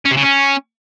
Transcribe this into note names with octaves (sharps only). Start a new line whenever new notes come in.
C#4
C3
C#3
C#4